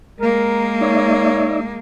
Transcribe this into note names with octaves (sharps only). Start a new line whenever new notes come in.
G#3 A#3 A#4
D#4 C#5 D5 E5